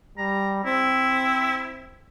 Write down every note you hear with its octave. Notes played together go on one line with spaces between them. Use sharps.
G3 A#5
C4 E4